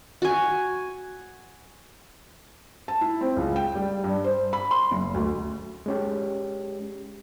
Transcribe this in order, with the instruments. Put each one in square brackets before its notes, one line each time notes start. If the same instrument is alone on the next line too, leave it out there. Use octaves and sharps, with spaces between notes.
[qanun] F#4 G#5
[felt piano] A5
E4
C4
C#2
G5
G3
G2
C5
B5
C6
F#1
D2
[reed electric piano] G#3 C#4 G4